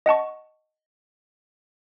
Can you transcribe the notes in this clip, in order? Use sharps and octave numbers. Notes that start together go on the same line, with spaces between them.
D#5 F#5 A5 C#6